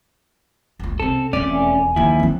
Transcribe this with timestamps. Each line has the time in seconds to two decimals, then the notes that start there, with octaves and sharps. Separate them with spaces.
0.80 F#1 C#2
1.00 C3 C4 C#4 A4
1.33 E1 F2 A3 C#4 D5
1.53 G#5
1.96 D#2 F3 C#4 E4
2.19 F3 F#3 C4